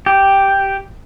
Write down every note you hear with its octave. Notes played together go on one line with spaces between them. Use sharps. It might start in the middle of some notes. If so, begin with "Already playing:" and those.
G4